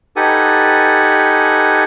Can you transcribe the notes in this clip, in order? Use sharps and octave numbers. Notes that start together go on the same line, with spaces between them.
D#4 G4 A4 B4 F#5 G#5